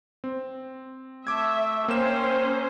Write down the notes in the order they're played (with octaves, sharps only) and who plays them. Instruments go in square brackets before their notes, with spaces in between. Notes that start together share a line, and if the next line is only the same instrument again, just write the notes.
[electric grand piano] C4
[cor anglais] A3 [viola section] E5 [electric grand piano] D6 G#6
[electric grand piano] A#3 E7 [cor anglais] C4 [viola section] C#4 C5